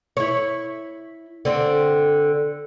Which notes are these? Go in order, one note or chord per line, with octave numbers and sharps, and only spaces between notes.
E4 C#5
D3 C4